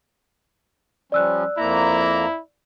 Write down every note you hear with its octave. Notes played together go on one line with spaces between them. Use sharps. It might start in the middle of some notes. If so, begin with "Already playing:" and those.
F3 G3 C#4 D5 E6 F#6
F2 A#3 E4 A#5